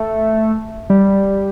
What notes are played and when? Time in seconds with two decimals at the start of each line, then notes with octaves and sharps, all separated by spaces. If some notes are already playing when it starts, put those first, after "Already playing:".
Already playing: A3
0.90 G3